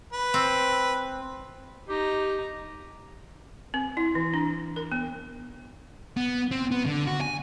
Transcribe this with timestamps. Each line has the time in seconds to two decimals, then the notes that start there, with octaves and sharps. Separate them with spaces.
0.13 B4
0.34 C4
1.89 D#4 G4 A#5
3.74 C4
3.97 E4
4.15 E3
4.34 D4
4.76 A#4
4.92 B3
6.17 B3
6.51 C4
6.71 B3
6.86 D3
7.07 F#4
7.21 G#5